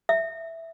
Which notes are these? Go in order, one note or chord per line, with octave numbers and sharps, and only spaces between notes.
E5